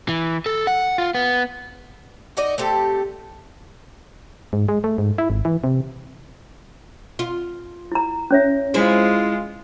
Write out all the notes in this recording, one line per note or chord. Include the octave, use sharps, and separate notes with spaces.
E3
A4
F#5
F4
B3
D#4 F#4 D5 D#5
A3 C4 G4 A4
G#2
G#3
A3
G#2
E4
G#1
E3
C3
F4
E4 A#5
C#4 C#5 E5
G#3 E4 F4 G#4 C5